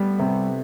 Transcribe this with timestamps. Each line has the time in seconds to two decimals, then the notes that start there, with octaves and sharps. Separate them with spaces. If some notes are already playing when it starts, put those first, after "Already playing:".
Already playing: G3 A3 B3
0.19 C3